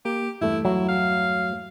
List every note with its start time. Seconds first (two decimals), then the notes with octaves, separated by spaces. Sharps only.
0.05 A#3 G4
0.41 E2 G2 A3 E4
0.65 F#3 E4
0.89 F5